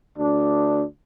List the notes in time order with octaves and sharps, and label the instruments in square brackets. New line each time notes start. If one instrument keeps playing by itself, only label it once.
[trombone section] D2 D4